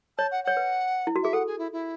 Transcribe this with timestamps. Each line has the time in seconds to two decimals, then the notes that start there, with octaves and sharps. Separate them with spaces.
0.17 C#5 A5
0.31 F#5
0.44 C#5 F#5
0.57 B4
1.07 E4
1.16 F#4
1.23 G#4 E5
1.33 A4 F#5
1.47 G#4
1.58 E4
1.72 E4